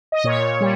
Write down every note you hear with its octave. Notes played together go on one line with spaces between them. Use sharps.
D#5
A#2 C#5
G3